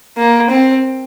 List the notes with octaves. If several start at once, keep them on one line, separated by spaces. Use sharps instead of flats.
A#3
C4